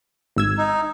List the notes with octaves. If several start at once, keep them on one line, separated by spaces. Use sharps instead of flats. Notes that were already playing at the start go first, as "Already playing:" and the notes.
G#1 E6 G#6
D#4